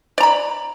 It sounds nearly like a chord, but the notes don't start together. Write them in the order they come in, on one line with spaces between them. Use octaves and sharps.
D5 A#5 B5